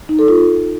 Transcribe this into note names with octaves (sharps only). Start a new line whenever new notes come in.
D#4
A4
F4